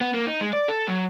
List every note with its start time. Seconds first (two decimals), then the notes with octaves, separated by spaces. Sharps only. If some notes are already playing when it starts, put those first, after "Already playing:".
0.01 B3
0.14 A#3
0.27 D#4
0.41 G#3
0.53 D5
0.68 A4
0.88 F#3